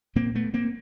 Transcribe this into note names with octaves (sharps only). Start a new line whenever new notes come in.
A#2 A#3 C4
A3 B3
A#3 C4